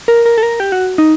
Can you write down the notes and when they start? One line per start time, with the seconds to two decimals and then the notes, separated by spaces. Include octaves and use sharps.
0.08 A#4
0.26 A#4
0.38 A4
0.43 A#4
0.60 G4
0.72 F#4
0.98 D#4